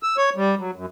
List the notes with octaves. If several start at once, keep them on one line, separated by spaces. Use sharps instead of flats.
E6
C#5
G3
F#3
F#2